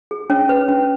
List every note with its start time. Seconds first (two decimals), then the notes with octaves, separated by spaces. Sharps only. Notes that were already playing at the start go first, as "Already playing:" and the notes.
0.11 G#4
0.30 C#4 C#5
0.49 B4
0.68 C#4